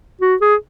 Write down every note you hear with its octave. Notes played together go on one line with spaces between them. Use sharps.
F#4
G#4